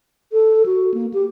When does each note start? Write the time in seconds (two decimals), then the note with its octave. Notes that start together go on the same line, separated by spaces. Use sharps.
0.32 A4
0.66 F#4
0.94 A#3
1.14 G4